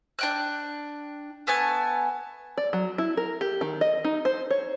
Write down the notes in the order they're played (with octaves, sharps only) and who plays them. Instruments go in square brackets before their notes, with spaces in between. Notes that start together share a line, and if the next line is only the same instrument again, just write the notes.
[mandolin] D4 G5 F#6
A3 B3 G#5 A5
[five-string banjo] D5
F#3
E4
A#4
G4
D#3
D#5
D#4
C5
C#5